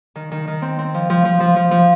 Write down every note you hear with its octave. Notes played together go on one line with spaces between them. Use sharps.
D#3
D#3
D#3
C4
C4
F3
F3
F3
F3
F3
F3